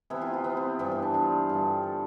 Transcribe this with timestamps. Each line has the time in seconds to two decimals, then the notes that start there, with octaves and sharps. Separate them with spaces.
0.10 C3 E3 B3 E4
0.21 F4
0.34 F4
0.44 B3
0.57 C4
0.79 G2 E3 B3
0.92 C4
1.02 D4
1.14 F4
1.49 G2 D3 G3
1.83 A4